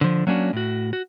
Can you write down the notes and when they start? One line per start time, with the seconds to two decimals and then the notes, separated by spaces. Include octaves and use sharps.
0.01 D3 F3
0.27 F#3 A#3 C#4 D4 F#4
0.53 A2 F#4
0.93 F#4